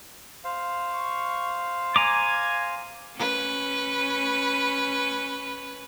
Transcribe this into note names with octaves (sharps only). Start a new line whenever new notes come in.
C5 F5
C#6
G#5 A#5 D6 G#6
C#4 B4